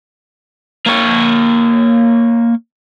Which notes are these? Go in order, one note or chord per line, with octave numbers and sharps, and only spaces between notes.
A#3 C#5